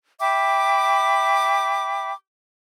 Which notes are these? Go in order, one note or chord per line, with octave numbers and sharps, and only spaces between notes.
E5 G5 B5 D6